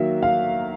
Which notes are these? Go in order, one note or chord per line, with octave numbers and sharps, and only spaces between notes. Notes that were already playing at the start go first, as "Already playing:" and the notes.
Already playing: D#3 F#3 A#3 E5
F5